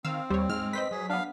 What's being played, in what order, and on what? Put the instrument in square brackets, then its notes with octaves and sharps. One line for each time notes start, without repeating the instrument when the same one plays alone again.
[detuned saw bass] D#3 [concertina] C4 [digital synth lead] F5 [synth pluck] E6
[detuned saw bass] D#2 [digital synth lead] G3 [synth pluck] C5 C#5
[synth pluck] G#2 [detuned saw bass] G#3 [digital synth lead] F6
[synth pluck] B4 C5 D#5 [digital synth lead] B6
[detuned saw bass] F#3 [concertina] G#4
[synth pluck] B3 D4 [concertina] F5